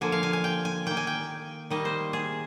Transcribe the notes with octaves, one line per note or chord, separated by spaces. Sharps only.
D3 F3 A#3 G#5
F5
G#5
G#5
G5
G#5
D#3 A#3 G5
G#5
G5
D#3 G3 A#3 D#5
C5
G#4